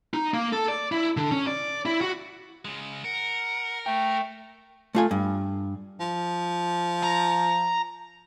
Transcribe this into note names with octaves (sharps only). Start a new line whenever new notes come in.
D#4
A#3
A4
D5
E4
D3
C#4
D5
E4
F#4
C#3 G#3
A#4 F#5
A3 G5
A3 F4 G#5
G2
F3
A#5